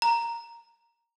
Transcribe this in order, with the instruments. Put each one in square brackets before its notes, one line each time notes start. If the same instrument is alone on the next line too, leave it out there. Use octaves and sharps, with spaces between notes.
[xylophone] A#5